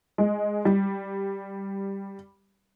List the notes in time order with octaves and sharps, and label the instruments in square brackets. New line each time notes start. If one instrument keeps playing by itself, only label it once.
[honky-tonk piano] G#3
G3